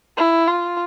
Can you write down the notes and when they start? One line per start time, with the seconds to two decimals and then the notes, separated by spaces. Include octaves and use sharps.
0.17 E4
0.47 F4